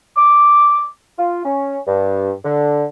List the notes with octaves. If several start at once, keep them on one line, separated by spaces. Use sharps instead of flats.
D6
F4
C#4
G2
D3